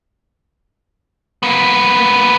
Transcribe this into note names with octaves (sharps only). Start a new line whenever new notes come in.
A#3 B3